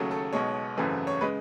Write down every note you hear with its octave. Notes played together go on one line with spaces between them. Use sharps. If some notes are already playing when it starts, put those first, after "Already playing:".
Already playing: D#2 C#3 F#3 A3
A4
B1 B2 G#3 C#5
G#1 F#2 C#3 E3 A3
C#5
C#3 G#3 B4